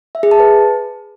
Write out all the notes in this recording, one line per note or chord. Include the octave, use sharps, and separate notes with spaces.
E5
G#4
A5
B4